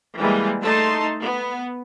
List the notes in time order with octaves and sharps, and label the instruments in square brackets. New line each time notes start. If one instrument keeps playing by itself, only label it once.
[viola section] E3 G3 G#3 A#3
A3 D#4 A5 C6
B3